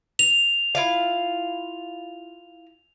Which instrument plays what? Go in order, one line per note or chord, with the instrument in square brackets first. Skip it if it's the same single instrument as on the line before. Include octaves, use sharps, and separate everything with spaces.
[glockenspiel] F7
[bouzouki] E4 F4 F5